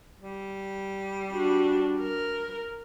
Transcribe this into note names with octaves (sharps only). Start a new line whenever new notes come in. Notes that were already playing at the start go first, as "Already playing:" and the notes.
G3
D4 F#4
A#4